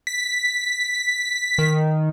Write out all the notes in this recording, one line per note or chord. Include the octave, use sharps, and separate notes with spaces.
B6
D#3